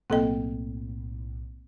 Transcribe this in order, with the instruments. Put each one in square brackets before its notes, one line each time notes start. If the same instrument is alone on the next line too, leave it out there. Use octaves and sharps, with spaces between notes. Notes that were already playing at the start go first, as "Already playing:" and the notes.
[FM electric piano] B1 A2 [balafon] A#3 A4 D#5 [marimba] C4 G5